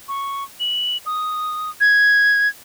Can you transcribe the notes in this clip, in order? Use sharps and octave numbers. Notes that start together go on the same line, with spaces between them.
C#6
F#7
D#6
G#6